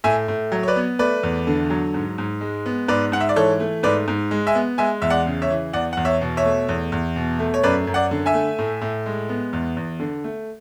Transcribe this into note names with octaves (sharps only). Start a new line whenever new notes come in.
A2 E5 G#5
A2
F#3
C#5
B4 D5
B3
A3 B4 D5
E2
D3
F#3
G#2
G#2
G#3
B3
G#2 B4 D5
G#2 F#5
E5
D5
E3 A4 C#5
A3
G#2 B4 D5
G#2
G#3
E5 G#5
B3
G#3 E5 G#5
E2 E5
D5 F#5
C#3
C#5 E5
E3
E2 D5 F#5
E2 F#5
C#5 E5
B2
C#5 E5
A3
E2
E2
B2
A3
C#5
F#2 B4 D5
F#2
D5 F#5
D3
E5 G#5
A3
A2
A2
G#3
B3
E2
E2
D3
A3